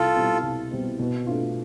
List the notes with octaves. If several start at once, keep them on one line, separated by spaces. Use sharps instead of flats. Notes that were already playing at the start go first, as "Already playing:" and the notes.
Already playing: C2 F4 A4
B2 G3 C4 E4
C2
B2 G3 C4 E4
B2
A3 D4 F4